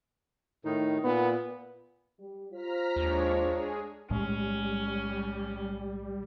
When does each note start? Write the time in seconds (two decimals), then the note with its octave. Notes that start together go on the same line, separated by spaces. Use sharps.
0.65 A2 D#3 D#4
1.04 A#2 B3
2.20 G3
2.52 F4 C5 A#5 F6 B6
2.96 D#2 G#3 D4 C#5
3.43 G#4
4.10 B1 A2 G3 G#3 C#4